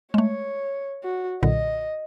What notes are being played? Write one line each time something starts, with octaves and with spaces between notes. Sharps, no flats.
G#3 A3 C#5
F#4
B1 A#2 D3 D#5